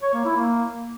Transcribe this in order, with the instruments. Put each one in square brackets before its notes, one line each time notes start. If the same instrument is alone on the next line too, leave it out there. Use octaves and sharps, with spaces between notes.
[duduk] C#5
A#3
E4
A#3